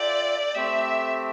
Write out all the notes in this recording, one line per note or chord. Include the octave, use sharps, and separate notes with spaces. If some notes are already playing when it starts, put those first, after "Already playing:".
Already playing: F4 A4 D5 E5 G5
A3 C4 G4 E5